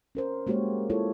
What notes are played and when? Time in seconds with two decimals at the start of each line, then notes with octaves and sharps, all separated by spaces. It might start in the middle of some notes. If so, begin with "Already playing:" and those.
0.15 C#4 A#4 C5
0.47 G#3 A#3 F#4 G4 C5 C#5
0.90 E4 F4 A4 C#5